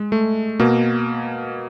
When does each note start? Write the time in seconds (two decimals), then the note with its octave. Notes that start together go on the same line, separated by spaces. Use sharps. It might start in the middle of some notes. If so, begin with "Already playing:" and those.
Already playing: G#3
0.12 A3
0.60 B2 A#3